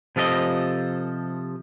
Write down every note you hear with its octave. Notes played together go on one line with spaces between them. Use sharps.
C3 F3 A4 A#4 D#5